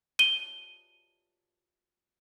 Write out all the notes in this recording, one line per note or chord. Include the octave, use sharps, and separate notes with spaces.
D#7 G7